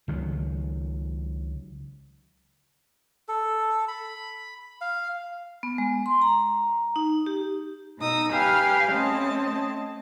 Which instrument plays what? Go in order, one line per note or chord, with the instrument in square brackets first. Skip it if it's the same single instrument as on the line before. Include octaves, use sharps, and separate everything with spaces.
[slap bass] C#2 D#3 F#3
[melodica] A4
B5
F5
[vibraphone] B3
G#3
C6
A#5
D#4
G4
[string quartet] B2 D#4 D#6 E6
G4 B4 F5 G5 G#5 F6
A3 C4 C#4 D#5 A5